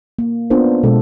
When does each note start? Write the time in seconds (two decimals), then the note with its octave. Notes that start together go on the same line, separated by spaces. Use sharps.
0.19 A#3
0.50 B3 C#4 D4 F4 A#4 C5
0.83 B2 G#3 A4